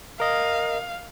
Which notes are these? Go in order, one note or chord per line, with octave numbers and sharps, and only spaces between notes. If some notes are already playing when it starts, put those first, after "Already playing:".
A#4 D#5 F5